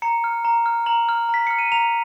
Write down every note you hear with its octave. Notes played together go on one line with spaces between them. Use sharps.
A#5 C#7
F6
A#5
F6
A#5 F#7
F6
A#5 B6
F6 C#7
D#7
A#5 F7